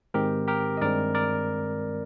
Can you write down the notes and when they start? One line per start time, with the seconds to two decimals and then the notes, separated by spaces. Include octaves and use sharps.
0.14 G#2 D#3 G#3 C4 G4 A#4
0.48 G4 A#4
0.77 D#5
0.81 G2 D#3 G#3 C4 A#4 D5
1.15 A#4 D5